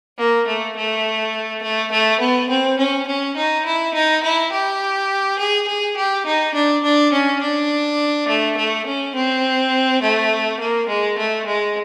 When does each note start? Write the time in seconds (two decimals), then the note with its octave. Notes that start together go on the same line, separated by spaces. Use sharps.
0.18 A#3
0.47 A3
0.77 A3
1.62 A3
1.92 A3
2.20 B3
2.50 C4
2.79 C#4
3.07 C#4
3.37 D#4
3.66 E4
3.94 D#4
4.23 E4
4.52 G4
5.39 G#4
5.68 G#4
5.96 G4
6.26 D#4
6.54 D4
6.84 D4
7.13 C#4
7.41 D4
8.28 A3
8.57 A3
8.86 C#4
9.15 C4
10.02 A3
10.60 A#3
10.88 G#3
11.18 A3
11.47 G#3